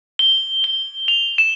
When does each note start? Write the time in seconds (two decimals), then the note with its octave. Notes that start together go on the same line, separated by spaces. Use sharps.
0.19 G7
0.64 G7
1.08 F7
1.38 E7